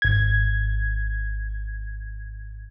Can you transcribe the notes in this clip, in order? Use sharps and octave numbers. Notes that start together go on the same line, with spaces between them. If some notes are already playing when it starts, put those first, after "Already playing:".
G#1 G#6